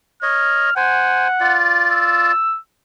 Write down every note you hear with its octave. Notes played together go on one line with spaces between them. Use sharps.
C#5 D#5 F6
C5 F#5 G#5
F4 D5
E6